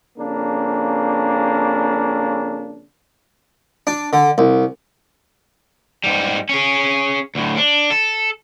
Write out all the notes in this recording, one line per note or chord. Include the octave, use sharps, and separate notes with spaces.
F2 C#3 A#3 D4
D4
D3
C2
G#2 G3
C#4 G#4
D2 A2
D4
A4